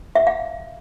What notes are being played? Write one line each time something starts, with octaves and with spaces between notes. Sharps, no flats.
E5
F5